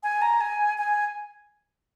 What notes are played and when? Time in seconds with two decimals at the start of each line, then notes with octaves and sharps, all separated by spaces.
0.03 G#5
0.22 A#5
0.41 G#5
0.78 G#5